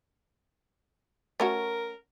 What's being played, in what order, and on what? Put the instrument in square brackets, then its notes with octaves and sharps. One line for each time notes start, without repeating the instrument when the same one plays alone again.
[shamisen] A3 C#4 F#4 [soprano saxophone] A#4